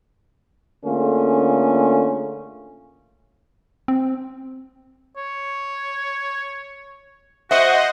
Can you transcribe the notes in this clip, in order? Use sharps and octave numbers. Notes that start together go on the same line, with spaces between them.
D3 A3 A#3 C#4 F4 G#4
C4
C#5
F#4 C5 D#5 E5 F#5